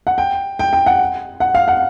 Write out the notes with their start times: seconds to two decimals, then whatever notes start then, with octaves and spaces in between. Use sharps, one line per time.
0.07 F#5
0.18 G5
0.59 G5
0.73 G5
0.86 F#5
1.40 F#5
1.55 F5
1.68 F#5